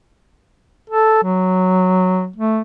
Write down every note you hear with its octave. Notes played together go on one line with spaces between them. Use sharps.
A4
F#3
A3